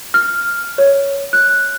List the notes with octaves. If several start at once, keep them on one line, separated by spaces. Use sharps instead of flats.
F6
C#5
F#6